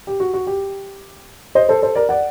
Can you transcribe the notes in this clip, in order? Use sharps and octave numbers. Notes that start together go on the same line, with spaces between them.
G4
F#4
F#4
G4
C5 D#5
A4 C5
A4 C5
A#4 D5
D5 F#5